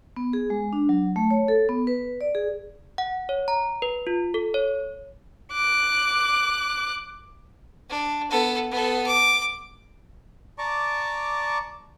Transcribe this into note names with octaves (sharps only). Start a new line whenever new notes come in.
B3
G#4
G#3
D4
F#3
A3
C#5
A4
B3
B4
D5
G#4
F#5
C#5
A#5
B4
F4
A4
C#5
D6 F#6
D4
B3 A4
B3 A4
D6
D5 A5 A#5 C#6 D6